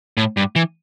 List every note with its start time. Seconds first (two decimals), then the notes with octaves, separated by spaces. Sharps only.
0.17 A2
0.37 G2
0.56 E3